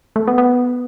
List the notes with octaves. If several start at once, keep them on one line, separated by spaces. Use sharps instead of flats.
A3
B3
B3